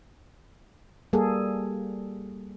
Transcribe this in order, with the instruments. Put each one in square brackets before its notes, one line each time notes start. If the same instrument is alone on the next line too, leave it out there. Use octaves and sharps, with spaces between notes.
[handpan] G3 A#3 G#4 A4